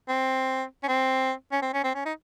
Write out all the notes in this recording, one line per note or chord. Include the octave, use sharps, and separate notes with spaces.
C4
C#4
C4
C#4
C4
C#4
C4
C#4
D#4